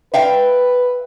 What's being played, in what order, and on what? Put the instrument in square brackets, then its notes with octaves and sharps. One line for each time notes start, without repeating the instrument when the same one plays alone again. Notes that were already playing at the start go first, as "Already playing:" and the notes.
[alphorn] B4 [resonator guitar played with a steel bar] E5 F5 G5